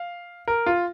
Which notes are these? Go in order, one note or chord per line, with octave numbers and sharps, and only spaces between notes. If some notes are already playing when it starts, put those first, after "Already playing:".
Already playing: F5
A#4
F4